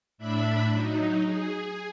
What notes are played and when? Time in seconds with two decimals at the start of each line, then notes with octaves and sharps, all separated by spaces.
0.18 A2 D4 E5 B5
0.70 F#3 D#4
1.25 G#4